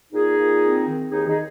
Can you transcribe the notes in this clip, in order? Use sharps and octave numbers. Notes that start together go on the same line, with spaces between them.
A#2 D#4 G#4
A#2
C4
D#3
D#2 D#4 G#4
D#4 G#4